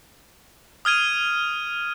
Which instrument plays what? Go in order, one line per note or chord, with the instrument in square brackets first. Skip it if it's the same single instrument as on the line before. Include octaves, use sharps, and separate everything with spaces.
[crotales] D#6 F6 G#6 D#7